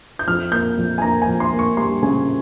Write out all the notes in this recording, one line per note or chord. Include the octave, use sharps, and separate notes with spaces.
G6
F2 F6
A#3 G6
F2
G#5
A#3 A#5
G#5
F2
C6
A#3
C#6
G3 C6
C#3 G#5